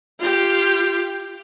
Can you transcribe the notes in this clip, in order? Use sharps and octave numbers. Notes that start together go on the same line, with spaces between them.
F4 G4